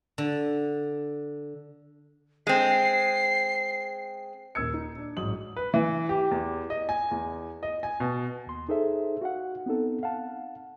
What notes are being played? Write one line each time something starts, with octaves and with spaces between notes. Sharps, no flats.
D3
G#3 C4 C7
D#1 D#2 A#4 E6 G#6 C#7
D#4
D4
A1 G#2 F#3 D#6 F#7
B4
E3
G4
E2
D#5
G#5
E2
D#5
G#5
B2
D#2 C6
D#4 G#4 A4 C5 E5
F#4 F5 F#5
B3 C4 D#4 A4
F5 F#5 A5